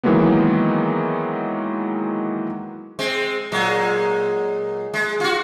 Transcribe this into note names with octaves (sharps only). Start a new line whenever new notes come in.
D#3 E3 F#3 G#3 A#3 B3
G#3 C4
A#2 F#3 G#3
G#3
F4 F#4